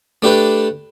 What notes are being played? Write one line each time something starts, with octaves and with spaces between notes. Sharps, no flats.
A3 D4 G4 B4